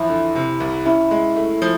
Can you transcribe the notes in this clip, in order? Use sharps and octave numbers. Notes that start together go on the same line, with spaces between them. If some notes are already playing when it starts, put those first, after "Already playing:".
Already playing: E2 F3 E4
D3
C3
C2
C#4 E4
G#3
A3
F3